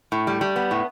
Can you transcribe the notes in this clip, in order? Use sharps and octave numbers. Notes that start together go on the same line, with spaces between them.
A2
G3
G3
B3
A2